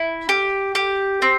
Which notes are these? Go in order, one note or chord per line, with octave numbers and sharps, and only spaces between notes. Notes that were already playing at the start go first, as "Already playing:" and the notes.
Already playing: E4
G4
G4
C4